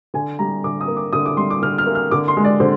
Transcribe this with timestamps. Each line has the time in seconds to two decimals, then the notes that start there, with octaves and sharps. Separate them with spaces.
0.14 D3 G#5
0.39 G3 A#5
0.64 D3 D6
0.81 D#6
0.88 A#3
0.97 D6
1.13 D3 D#6
1.26 D6
1.37 G3 C6
1.50 D6
1.62 D3 F6
1.78 F6
1.86 A#3
1.95 F6
2.11 D3 D6
2.28 C6
2.37 G#3
2.44 D5
2.60 D3 C5